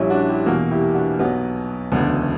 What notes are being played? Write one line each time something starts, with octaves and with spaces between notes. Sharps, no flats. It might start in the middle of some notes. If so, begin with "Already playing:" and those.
Already playing: A#1 A#2 G3 C#4 E4
D4 F#4
E4 G4
E2 B2 A#3 F#4 A#4
E4 G4
D4 F#4
B1 B2 F#3 B3
E1 D2 C#3 B3 D4